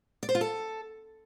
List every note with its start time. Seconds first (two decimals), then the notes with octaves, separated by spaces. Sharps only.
0.23 D5
0.29 C5
0.35 F4
0.41 A4